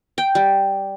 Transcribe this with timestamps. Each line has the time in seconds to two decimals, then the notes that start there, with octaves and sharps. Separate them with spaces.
0.18 G5
0.35 G3